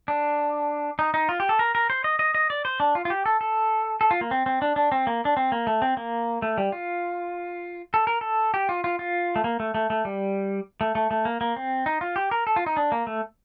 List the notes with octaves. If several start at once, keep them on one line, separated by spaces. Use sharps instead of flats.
D4
D#4
D#4
F4
G4
A4
A#4
A#4
C5
D#5
D#5
D#5
D5
C5
D4
F4
F4
G4
A4
A4
A4
F4
A#3
C4
C4
D4
D4
C4
A#3
D4
C4
A#3
A3
C4
A#3
A3
G3
F4
A4
A#4
A4
G4
F4
F4
F4
A3
A#3
A3
A3
A3
G3
A3
A3
A3
A#3
A#3
C4
D#4
F4
G4
A#4
A4
F4
D#4
D4
A#3
A3